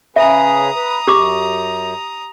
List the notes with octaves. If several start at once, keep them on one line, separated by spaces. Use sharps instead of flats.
C#3 G#4 B4 E5 A#5 D#6
B4
F#2 G4 D6